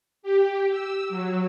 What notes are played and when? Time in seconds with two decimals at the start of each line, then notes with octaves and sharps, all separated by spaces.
0.23 G4
0.70 E6
1.09 F#3